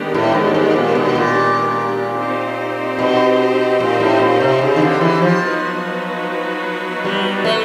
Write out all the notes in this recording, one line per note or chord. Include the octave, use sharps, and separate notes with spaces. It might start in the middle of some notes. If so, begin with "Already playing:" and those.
Already playing: D#3 G#3 B3 D4 G4
A2
G#2
G#2
A#2
B2
A#2
C4 D#4 G4 C5
B2
A#2
A2
A#2
C3
C#3
D#3
D3
E3
F3
F#3 B3 D#4 F#4 B4
G3
A3